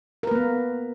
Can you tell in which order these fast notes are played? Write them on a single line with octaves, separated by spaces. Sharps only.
A#4 B4 A#3 B3